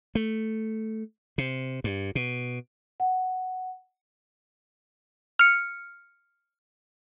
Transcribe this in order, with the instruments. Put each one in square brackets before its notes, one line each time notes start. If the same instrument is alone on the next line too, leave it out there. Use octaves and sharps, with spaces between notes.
[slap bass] A3
C3
G2
B2
[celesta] F#5
[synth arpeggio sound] F6 C#7